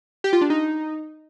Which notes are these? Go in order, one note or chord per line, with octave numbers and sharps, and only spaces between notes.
G4
F4
D4
D#4